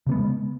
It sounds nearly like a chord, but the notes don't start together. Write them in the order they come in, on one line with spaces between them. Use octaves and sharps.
C#3 A#3 B3 G#3